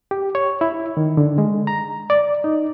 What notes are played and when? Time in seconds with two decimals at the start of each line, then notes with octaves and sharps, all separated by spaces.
0.11 G4
0.35 C#5
0.61 E4
0.97 D#3
1.17 D3
1.38 G#3
1.67 A#5
2.10 D5
2.44 D#4